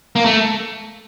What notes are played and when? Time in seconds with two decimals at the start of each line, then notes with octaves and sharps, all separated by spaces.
0.16 A#3
0.25 A3